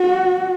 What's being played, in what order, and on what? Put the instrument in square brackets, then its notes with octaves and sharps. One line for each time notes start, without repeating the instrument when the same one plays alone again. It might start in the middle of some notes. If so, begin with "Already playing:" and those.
Already playing: [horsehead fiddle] F#4